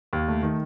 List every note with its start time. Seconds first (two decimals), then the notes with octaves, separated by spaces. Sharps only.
0.13 D#2
0.28 A3
0.43 D#3